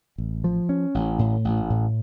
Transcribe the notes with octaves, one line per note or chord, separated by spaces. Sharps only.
A1
F3
C#4
A1
A2
A1
A2